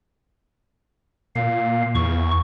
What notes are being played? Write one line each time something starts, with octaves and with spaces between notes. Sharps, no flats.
A#2 F5
E2 C#6